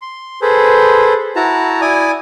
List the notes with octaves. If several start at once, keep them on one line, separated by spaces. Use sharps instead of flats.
C6
G#4 A4 B4 C5
E4 F#4 A5 A#5
E4 D5 G#5 D#6